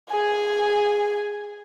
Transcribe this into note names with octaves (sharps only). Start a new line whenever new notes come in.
G#4 G#5